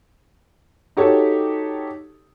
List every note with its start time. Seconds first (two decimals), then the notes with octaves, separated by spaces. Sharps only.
0.97 D#4 F#4 G4 A4 C#5